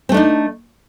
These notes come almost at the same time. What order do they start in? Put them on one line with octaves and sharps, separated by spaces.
C4 A3 D4 D#4